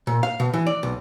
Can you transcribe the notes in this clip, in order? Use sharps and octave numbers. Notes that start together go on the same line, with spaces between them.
A#2
F5
B2
E3
D5
B1